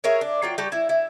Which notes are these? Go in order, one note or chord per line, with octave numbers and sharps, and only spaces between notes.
E4 G#4 A#4 C#5
D4
F#3 F4 G5
G3 F#4 G4 A5
E4
E4